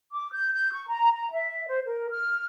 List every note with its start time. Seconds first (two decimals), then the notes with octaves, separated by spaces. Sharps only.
0.12 D6
0.32 G6
0.52 G6
0.73 C#6
0.88 A#5
1.15 A#5
1.31 E5
1.67 C5
1.86 A#4
2.10 F6